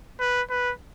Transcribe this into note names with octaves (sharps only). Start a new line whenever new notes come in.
B4
B4